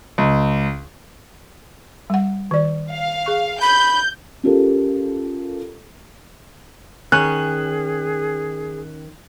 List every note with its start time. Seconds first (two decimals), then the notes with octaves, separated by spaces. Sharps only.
0.18 C#2
2.10 G3 F#5
2.51 D#3 D5
2.92 F5
3.26 G#4 C#6
3.61 B5 G6
4.43 C#4 F4 G4 A4 A#4
7.12 D#3 C#4 G#4 F#6